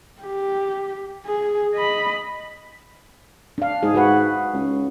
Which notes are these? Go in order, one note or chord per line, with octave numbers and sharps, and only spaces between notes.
G4
G#4
D#5 B5
D4 F5
G#2 G#4
F#4 B4 F#5
C#2